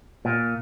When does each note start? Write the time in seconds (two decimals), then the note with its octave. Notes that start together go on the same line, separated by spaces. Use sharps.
0.25 A#2